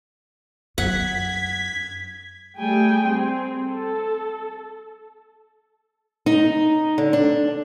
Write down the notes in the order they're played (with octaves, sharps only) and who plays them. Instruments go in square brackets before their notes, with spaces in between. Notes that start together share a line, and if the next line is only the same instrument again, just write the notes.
[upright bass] F#2 [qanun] F#5 [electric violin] G#6 [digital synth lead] B6
[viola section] G3 A3 G#4 G5 G#5
C4
A4
[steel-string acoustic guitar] D#4
D3
D4